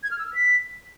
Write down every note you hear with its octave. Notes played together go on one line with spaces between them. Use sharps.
G#6
F6
E6
F6
B6